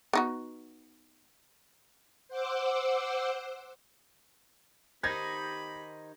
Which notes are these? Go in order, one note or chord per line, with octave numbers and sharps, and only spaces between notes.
B3 D#4 F#4
C5 F#5 D6 E6
D#3 D#4 G4 C5 B5 G6 G#6 A#6